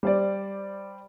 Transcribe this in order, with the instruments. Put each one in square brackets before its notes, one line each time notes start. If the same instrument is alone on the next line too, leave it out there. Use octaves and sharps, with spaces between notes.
[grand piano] G3 C5 D5